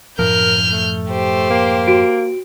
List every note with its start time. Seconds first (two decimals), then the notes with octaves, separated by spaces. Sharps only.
0.19 F#2 A2 F3 A#4 F6 G6
0.70 A3
1.09 G4 C5
1.50 A#3
1.88 F#4 D7